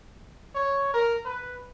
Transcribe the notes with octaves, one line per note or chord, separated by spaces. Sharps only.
C#5
A#4
B4